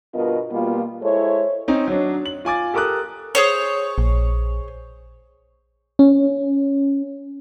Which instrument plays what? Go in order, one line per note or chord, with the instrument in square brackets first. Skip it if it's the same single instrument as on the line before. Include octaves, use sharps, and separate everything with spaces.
[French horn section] G2 B2 B3 F4 A#4 D#5
B2 G3 A#3 B3 F4
G#3 E4 A4 C5 C#5
[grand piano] C4 C#4 D#4
F#3 D4
F#7
F4 G#5 D6 A6
G4 A4 A#4 D6 D#6 F#6
[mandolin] G#4 C5 C#5
[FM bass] A#1
[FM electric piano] C#4